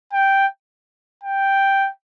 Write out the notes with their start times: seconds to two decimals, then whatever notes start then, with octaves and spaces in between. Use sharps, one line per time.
0.13 G5
1.24 G5